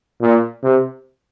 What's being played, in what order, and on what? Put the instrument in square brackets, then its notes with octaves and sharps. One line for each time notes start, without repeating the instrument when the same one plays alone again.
[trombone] A#2
C3